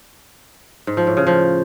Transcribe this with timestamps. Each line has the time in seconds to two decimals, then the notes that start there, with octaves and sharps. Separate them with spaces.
0.87 G#2
0.97 F3
1.07 A2
1.17 C#3
1.27 F3